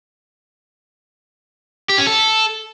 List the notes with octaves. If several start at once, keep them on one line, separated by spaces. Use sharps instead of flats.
G4
C#4
A4